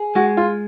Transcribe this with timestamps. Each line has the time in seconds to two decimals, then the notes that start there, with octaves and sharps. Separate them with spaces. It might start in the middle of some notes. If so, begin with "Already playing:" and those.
Already playing: G#4
0.15 G#3 F#4
0.37 F4